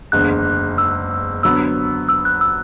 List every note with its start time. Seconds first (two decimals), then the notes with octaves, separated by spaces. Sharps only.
0.12 F#1 E2 D3 G#3 F#6
0.78 E6
1.43 D3 F#3 B3 E6
2.09 E6
2.25 F#6
2.41 E6